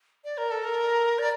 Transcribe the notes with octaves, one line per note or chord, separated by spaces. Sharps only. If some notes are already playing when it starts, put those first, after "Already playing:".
D5
A#4
A4
A#4
D5